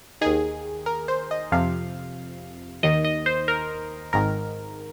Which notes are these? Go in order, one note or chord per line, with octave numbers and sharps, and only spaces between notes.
D#2 D#3 G#4
A#4
C5
D#5
F2 C3 F3 F5
D#2 D#3 D#5
D#5
C5
A#4
G#1 G#2 D#3 A#4